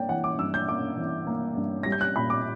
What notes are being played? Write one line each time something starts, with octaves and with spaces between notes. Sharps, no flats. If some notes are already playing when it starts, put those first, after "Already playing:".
Already playing: G2 A#3 C#5 D5 G5
E3 F#5
D6
G2 E6
G6
A#3 D6
E3
A#3
G2
G3 A#6
G6
F#6
A#2 B5
D6